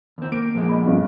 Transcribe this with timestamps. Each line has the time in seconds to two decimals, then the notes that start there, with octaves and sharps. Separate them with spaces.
0.18 D#2 C4
0.32 A#3 D7
0.55 F2 A#2 G#3
0.69 D#5 B5
0.86 G2 C#3